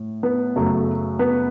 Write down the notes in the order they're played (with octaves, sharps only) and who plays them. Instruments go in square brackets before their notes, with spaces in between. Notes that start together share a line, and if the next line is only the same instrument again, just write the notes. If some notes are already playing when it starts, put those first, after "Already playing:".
Already playing: [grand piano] A2
B3 B4
F#2 C#3 F#3 A3
B3 B4